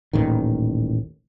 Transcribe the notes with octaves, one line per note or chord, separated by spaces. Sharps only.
D#1 A1 A#2 D#3